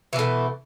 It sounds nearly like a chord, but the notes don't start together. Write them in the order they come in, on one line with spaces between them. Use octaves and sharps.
E3 B2 A3